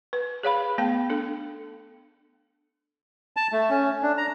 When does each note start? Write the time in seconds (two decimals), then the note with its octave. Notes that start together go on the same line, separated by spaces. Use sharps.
0.13 B4
0.43 G#4 C#5 F5 B5
0.78 A3 B3 F5 G5
1.10 D4 A4
3.37 A5
3.52 A3
3.70 C#4
4.02 D4
4.18 A#5